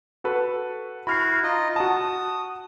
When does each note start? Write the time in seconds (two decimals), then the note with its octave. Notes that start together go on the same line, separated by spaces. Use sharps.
0.24 F#4 A4 B4
1.07 E4 F#4 B5 F6 C7
1.43 D#4 F4 D#5
1.76 F#4 A5 D#6